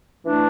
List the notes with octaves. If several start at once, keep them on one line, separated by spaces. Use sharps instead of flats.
E3 A3 D4